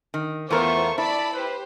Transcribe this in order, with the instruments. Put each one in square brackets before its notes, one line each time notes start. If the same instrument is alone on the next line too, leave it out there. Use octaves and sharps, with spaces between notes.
[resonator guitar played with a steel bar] D#3
[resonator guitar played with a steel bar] E2 A3 A#4 [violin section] B3 F4 C5 [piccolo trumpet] C#6
[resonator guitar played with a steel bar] E4 [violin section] D5 B5 [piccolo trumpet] A5
[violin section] G4 C5 [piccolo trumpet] B4